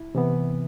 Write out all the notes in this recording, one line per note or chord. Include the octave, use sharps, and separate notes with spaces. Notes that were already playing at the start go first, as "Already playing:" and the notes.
Already playing: E4
C3 E3 B3